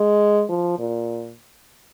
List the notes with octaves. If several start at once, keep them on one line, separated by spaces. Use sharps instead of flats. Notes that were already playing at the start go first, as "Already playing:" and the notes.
Already playing: G#3
F3
A#2